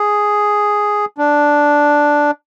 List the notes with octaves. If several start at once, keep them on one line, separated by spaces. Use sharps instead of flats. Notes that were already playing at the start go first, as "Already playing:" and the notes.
Already playing: G#4
D4